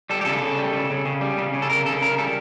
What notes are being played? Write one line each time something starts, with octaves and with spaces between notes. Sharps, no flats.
G3 A4
G4
C#3 A4
C#3
G3
C#3
C#3
C#3
G3
C#3
C#3
A4
C#3 A#4
C#3 A4
C#3 A#4
G3 A4